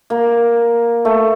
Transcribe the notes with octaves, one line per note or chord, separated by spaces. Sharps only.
A#3
A3